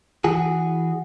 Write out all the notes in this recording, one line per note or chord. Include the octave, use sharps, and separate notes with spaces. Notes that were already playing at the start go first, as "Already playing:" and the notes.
E3 F#4 G#4